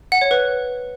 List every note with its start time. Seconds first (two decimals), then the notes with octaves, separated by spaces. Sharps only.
0.12 F#5
0.21 C#5
0.31 B4